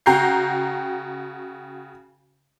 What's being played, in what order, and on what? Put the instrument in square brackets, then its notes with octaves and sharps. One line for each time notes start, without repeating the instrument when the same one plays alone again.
[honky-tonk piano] C#3 F#4 G5 A#5 G6 C7